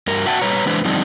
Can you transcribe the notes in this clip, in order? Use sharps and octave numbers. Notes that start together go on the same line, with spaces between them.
G2 A#4
F#4 E5 F#5 G5 A5
G3 B4 C#5 A#5
E3 G#3 D4 B4 C5
D3 F3 G3 C4 D4 D#4